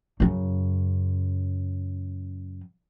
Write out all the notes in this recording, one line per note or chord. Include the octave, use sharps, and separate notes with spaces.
F#2 C#3